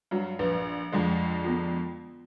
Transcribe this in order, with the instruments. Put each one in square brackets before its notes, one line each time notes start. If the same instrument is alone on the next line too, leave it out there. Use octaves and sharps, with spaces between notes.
[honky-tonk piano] G2 F#3
[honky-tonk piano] A#1 [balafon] B4
[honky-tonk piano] F2 D3 G#3
[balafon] B3 F4